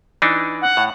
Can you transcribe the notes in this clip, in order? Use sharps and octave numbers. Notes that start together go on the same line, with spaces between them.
E3 D4 D#4
F#5
A2